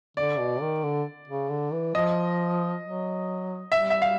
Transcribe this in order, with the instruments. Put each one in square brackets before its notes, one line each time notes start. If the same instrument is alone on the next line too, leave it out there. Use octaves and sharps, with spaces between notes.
[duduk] D3 [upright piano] D5
[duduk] B2
D#3
D3
C#3
D3
E3
[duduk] F3 [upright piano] D#5
[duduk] F#3
[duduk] G3 [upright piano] E5
[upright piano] E5
F5